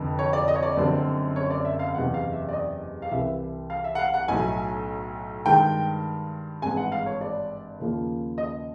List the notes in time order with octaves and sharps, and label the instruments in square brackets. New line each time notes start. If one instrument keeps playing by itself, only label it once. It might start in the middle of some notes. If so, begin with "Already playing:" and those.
Already playing: [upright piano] F1 F2 D3
C#5
D5
D#5
C#5
D5
F#1 F#2 D3 G3 C4
C#5
D5
E5
F5
F#1 E2 C3 F#5
F5
E5
D5
D#5
F5
C2 C3 E3 E5
F5
E5
F#5
F5
F#5
B1 A2 F#3 A3 G#5
G2 D#3 G#3 G5
G#1 G2 E3 G#3 G#5
F#5
F5
C#5
D5
D#2 C#3 F3 A#3
D#5